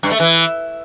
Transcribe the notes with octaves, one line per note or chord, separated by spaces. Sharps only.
G2
A3
E3